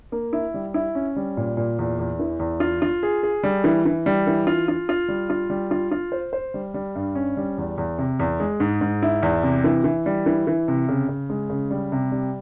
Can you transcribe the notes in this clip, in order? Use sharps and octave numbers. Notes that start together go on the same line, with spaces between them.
A#3
E4
G3
E4
C#4
G3
A#2
A#2
E2
E2
E3
E2
F4
F4
G#4
G#4
G3
E3
E3
G3
E3
F4
F4
F4
G3
F4
G3
F4
F4
C5
C5
G3
G3
G2
C#4
G3
E2
E2
C3
E2
G#3
G#2
G#2
E4
E2
C3
E3
E3
G3
E3
E3
C3
C#3
C#3
G#3
C#3
G3
C3
G3